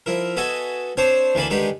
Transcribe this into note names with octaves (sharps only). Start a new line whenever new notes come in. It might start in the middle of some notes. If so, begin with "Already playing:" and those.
F3 E4 A#4
B3 F#4 A4 D#5 E5 G#5
C4 D4 C5 C#5
D2 D3 E3 A#3 A5 B5
D3 D#3 G#3 D#4 G4 B4